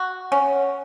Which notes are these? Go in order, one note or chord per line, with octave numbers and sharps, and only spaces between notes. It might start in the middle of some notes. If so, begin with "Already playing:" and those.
Already playing: F#4
C#4